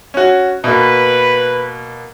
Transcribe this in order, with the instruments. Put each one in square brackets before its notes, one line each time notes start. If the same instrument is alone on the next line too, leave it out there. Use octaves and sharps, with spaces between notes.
[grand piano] C#4 F#4
[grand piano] B2 A#3 [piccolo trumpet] B4